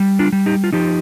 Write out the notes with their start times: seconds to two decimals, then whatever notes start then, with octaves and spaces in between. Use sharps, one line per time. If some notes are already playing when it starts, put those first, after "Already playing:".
Already playing: G3
0.19 D4 F4
0.32 G3
0.46 D#4 G4
0.64 F4
0.73 F3 D#4 G4